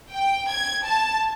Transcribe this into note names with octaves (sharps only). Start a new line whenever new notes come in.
G5
G#6
A5